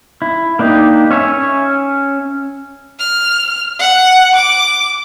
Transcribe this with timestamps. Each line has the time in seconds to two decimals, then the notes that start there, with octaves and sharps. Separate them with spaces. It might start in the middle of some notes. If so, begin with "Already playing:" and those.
0.22 E4
0.59 A#3 D4 D#4 G4
1.10 C#4 C#5 E5 G#5
2.99 F6
3.79 F#5
4.35 D6